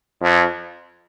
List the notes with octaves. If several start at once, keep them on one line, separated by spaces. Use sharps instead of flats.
F2